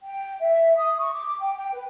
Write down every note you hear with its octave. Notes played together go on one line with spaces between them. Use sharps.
G5
E5
D#6
C#6
D6
G5
G5
B4